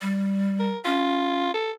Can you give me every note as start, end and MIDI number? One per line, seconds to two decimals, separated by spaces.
0.02 0.70 55
0.60 0.79 70
0.85 1.48 61
0.85 1.53 65
1.54 1.71 69